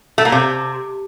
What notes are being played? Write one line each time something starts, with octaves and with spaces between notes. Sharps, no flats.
A3
A#3
C3